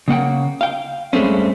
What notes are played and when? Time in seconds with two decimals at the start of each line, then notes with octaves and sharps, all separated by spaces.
0.08 C#3 A#3 F#5 G5
0.61 F5 G5
1.13 G2 G#3 A3 C4 C#4